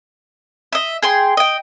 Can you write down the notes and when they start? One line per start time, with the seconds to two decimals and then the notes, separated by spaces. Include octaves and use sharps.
0.73 D#5 E5
1.03 G#4 G5 C6
1.37 D#5 G5